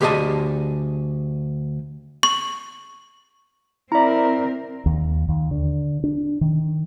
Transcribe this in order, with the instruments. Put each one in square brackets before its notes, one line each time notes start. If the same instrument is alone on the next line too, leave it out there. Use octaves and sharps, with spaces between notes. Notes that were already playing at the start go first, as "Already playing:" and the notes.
[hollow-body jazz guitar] D2 G4 G#4 D5 D#5 A5
[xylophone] C#6
[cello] C4 A#4 [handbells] E4 E5 [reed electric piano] D5 A#5
[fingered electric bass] D#2
D#2
D3
D4
D#3